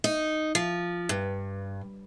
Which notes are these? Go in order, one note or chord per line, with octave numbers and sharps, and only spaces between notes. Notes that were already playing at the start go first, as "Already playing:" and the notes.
D#4
F3
G2